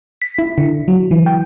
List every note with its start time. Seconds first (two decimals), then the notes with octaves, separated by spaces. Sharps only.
0.22 B6
0.39 E4
0.58 D3
0.88 F#3
1.11 E3
1.26 G5